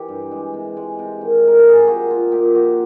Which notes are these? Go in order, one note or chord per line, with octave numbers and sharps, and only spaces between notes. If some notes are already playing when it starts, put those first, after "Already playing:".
Already playing: E3 G4
G2
G#3
C3
G#3
C3
D#3
C3 A#4
A4
G#3 G#4
G4
A#2 F#4
A#3 F4
A#2 G4
F3 F#4